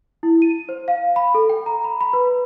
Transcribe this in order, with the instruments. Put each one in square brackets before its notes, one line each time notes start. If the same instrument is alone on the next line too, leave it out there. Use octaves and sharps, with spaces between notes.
[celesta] E4
D#7
C5
F5
B5
A4
G5
A#5
B5
B5
B4